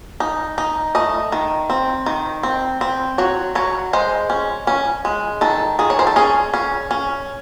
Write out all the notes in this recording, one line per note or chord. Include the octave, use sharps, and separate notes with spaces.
D#4
D#4
A3 D#5
D#3
C4
D#3
C4
C4
F#3 C#5
F#3 C#5
G#3 C5
C#4
C#4
G#3
D#3 A4
D#3 G#4
C#5
C5
A4
C#4 G#4
C#4
C#4